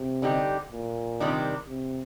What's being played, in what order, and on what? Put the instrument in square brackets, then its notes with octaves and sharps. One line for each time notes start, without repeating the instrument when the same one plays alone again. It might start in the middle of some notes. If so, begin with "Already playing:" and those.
Already playing: [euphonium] C3
[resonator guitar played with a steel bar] D3 G3 C4 D#4 G4
[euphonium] A#2
[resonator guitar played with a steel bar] C3 D#3 G3 D4
[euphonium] C3